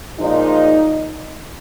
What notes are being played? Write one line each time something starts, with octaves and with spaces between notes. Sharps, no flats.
A#2 F3 G#3 D#4